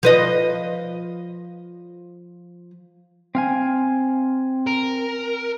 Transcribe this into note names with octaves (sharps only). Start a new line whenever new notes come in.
F3 B4 D#5
C4 F5 G#5
A#4